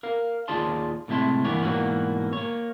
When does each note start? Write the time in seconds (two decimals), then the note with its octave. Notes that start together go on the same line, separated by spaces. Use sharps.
0.03 A#4 F5
0.48 D#2 F4 G#4 D5 A5 C6
1.08 A2 C3 G#3 E4 A5 C6
1.44 G2 E3 A#3 B3 C#5
1.62 G#2 B2 E3 G3 A#3 F#4
2.33 A#3 C#5